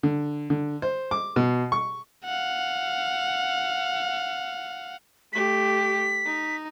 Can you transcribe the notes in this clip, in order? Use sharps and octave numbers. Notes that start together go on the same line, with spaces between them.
D3
D3
C5
D6
B2
C#6
F5 F#5
A3 G4 B6
D#4